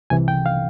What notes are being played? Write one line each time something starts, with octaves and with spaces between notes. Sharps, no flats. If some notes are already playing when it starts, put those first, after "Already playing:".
C2 C3 E3 G#5
G5
F5